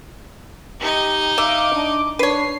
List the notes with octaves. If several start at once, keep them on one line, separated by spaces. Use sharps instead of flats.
D#4 G4 D#5
E5 F5 D6
D4
D4 B4 C#5 C7